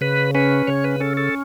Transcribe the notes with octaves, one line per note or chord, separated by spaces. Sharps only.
C#3 B4
C#4 B4
C#3 C#5
B4
C#4 A4
A4